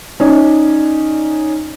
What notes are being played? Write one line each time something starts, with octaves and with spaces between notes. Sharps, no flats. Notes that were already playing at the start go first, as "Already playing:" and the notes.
C#4 D#4 D5